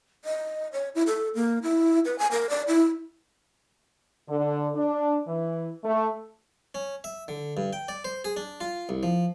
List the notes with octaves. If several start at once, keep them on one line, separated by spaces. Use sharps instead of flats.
D#5
C#5
E4
A4
A#3
E4
B4
G#5
A#4
D5
E4
D3
D4
E3
A3
C#4
E5
D3
G2
G5
D5
C5
G#4
D4
F4
C2
F3